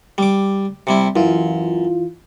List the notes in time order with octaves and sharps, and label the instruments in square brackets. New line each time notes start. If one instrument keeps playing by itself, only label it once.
[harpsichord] G3 D6
C3 G3 E4
[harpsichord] F#2 [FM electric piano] E3 F4